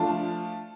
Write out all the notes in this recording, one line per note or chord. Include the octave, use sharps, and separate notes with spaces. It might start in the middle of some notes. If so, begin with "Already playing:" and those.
Already playing: F3 A3 D4 F4 A5